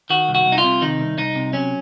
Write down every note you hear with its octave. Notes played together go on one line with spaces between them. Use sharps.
D#3 F#4
C2
F#4
C2
D#4
F4
C3
D#3 D#4
C2
C2 D#4
C3
F#3 C#4